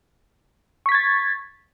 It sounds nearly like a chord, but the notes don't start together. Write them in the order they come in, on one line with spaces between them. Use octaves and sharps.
C#6 B6 G#6 A6